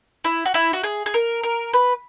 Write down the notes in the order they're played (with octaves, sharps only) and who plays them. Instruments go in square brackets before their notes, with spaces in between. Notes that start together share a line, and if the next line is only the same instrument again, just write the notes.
[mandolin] E4
F#4
E4
F#4
G#4
G#4
A#4
A#4
B4